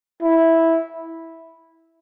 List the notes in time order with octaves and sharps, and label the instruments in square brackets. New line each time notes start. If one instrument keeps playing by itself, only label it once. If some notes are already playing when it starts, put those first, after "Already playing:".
[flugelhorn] E4